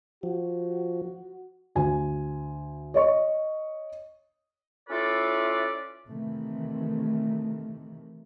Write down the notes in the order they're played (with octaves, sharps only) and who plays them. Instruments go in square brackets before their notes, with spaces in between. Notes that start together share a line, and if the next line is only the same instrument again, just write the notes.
[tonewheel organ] F3 [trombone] F#4
[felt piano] D2 G#5
C#5 D#5 C#6
[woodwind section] C#4 E4 F4 A4 B4 D5
[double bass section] C3 D#3 E3 A3